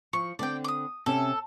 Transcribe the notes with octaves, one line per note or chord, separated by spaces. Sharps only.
F3 C#6
D3 C4 D5 G5
D6 D#6
C3 C#4 A4 E5